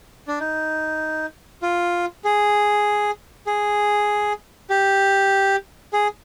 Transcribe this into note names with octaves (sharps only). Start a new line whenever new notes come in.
D4
D#4
F4
G#4
G#4
G4
G#4